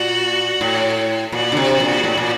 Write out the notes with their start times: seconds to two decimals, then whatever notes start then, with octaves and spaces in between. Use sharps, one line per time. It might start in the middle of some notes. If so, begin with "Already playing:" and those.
Already playing: A#2 F#4
0.61 A2
1.32 A#2 F#4
1.52 D3
1.57 C3
1.80 A#2
2.04 A2
2.17 A#2